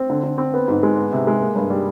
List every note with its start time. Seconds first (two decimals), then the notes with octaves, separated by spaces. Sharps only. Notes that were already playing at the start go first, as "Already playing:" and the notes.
Already playing: C4
0.10 D3
0.23 D3
0.38 C4
0.54 B3
0.68 G#2
0.83 G#3
0.97 B3
1.12 C3
1.27 G#3
1.41 A#3
1.55 G2
1.70 G3